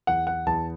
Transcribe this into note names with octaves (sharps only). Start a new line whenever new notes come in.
E2 F#5
F#5
E2 A5